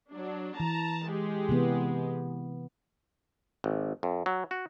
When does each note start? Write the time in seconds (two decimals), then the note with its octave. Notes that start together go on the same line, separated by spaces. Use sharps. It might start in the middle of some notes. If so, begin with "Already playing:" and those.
0.11 F#3 D4
0.60 E3 A5 A#5
1.08 G#3 G4
1.49 C3 E3 B3
3.64 G#1
4.03 F2
4.26 F#3
4.51 F#4